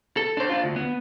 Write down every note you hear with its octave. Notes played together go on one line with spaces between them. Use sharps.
A4
D4 C5
D4 F4
D2
B3